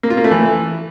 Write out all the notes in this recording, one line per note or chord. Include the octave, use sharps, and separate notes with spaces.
A#3
F4
A#3
A3
E3